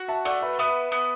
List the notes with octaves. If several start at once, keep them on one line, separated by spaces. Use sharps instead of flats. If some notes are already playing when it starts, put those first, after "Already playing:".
Already playing: F#4
E5 A5
A3 D5 F#5
B4 E5
B3 B4 E5
B3